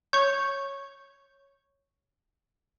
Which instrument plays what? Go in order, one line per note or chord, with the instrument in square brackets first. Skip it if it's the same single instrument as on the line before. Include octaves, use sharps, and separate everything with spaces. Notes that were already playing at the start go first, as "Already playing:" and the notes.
[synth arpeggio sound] C#5 [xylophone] C#6 G6